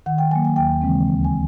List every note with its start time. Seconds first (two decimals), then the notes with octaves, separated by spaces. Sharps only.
0.06 D#3 F#5
0.18 G5
0.31 F#3 A#3 G#5
0.45 G#5
0.56 D#2 G5
0.82 C#3 E3 G#3 C4
1.08 D2
1.25 G#5